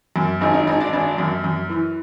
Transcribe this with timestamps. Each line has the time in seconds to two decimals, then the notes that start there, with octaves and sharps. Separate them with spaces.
0.16 F#2
0.41 G#1 D#4
0.54 D#4
0.67 G#1 D#4
0.80 D4
0.93 G#1 D4
1.18 F#2
1.44 F#2
1.70 E3